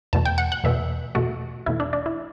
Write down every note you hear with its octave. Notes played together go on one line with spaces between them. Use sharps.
E2 B2 A3 A5
G5
F#5
F#5
E2 B2 A3 E5
E2 B2 A3 F#4
E2 B2 A3 E4
D4
D4
E4